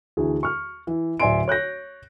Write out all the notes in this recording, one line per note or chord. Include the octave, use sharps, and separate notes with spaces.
D2 E3 G#4
C#6 F6
E3
D1 D5 E5 G#5 C6 D7
C#5 F#6 G6 A#6